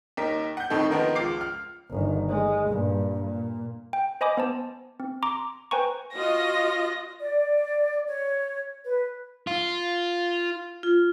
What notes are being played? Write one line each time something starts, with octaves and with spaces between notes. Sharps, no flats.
D#2 D#4 A#4 B6
F#5 G6
F2 A2 D#3 D#4 A4
D#3 F3 B3 D#4 A#4
C#2 F4 D6 C7
F6
G1 D#3
G#3
G2 A#2
A#2
G5
C5 D#5 G#5 B5 D6 D#6
B3 C5 A5
C4
A#5 C6 D6
B4 C5 G5 G#5 A#5 C#6
F4 F#4 D#5 A#6
D5
C#5
B4
F4
F4